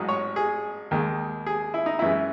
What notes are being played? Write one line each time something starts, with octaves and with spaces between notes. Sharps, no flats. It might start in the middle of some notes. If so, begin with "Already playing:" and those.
Already playing: A1 G#2 F#3 D#5
C#5
G#4
D#2 D#3 G#3
G#4
E4
D#4
F#2 E3 G#3 E4